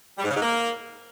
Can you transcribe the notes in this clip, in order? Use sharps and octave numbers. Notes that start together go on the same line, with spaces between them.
G3
G#2
C#3
G#2
A#3